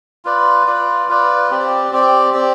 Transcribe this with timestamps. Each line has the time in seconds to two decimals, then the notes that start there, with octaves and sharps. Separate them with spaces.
0.25 F4 B4 D5
0.67 F4 B4 D5
1.09 F4 B4 D5
1.50 C4 G4 D5
1.92 C4 G4 D5
2.34 C4 G4 D5